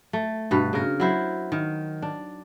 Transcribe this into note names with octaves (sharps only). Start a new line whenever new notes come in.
A3
G2 B2 B4
C#3 A#4
F#3 E4 C5
D#3
D4